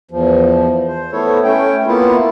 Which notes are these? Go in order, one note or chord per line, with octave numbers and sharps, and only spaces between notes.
E2 F3
C5
A3 B3 E4 A4 C#5
A3 C#4 G5
A#3 B3 E4 F4